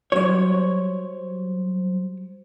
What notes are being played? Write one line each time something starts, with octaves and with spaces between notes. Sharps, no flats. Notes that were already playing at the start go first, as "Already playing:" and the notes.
F#3 G3 C5 C#5